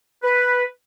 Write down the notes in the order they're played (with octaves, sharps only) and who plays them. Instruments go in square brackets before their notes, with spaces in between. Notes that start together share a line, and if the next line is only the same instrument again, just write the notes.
[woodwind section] B4